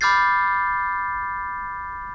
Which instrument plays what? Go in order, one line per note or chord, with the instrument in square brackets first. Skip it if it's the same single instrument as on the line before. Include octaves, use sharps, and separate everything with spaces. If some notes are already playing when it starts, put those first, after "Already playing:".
[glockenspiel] B5 D6 F6 G6 A6 C7